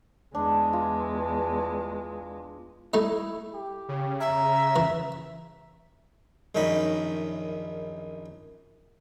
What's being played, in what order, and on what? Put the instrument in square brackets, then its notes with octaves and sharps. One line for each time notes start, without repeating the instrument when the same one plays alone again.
[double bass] E2 G#3 [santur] D4
[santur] F4
[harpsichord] G3 A3 D#4 [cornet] E4
[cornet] G4
[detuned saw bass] C#3
[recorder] E5 [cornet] A#5
[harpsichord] E3
A#1 F#2 D#3 C#4 D#4 B5